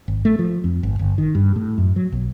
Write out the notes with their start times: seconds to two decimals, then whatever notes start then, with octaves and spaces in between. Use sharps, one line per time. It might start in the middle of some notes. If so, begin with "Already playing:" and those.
0.08 G#1
0.25 A3
0.39 F3
0.64 F2
0.83 G#1
0.99 G1
1.18 D#3
1.35 G2
1.56 A2
1.78 F#2
1.96 F#3
2.12 B1